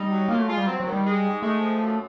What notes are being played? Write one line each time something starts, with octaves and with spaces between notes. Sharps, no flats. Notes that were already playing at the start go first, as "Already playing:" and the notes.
Already playing: G3 D#4
F#3
A#3 F4
A3
G#3 F4
G3
F#3 C4
F#3
D#3
G3
G#3
G#2
G#3 A3
F3
F#2